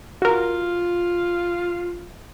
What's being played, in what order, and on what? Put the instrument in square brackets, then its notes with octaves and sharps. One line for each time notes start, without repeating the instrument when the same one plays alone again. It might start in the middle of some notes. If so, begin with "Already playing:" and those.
[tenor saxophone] F4 [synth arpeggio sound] F#4 A#4